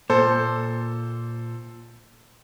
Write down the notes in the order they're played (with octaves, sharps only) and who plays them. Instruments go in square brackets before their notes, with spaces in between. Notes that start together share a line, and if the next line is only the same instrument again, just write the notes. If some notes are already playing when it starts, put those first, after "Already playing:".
[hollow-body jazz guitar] A#2 [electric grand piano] A4 C5